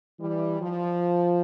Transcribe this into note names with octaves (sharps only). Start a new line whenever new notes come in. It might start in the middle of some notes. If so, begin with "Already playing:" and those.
E3 G3
F3